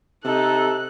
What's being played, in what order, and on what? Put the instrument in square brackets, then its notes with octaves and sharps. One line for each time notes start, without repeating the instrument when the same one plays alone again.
[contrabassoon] C3 [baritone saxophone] D#4 [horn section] A4 [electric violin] F#6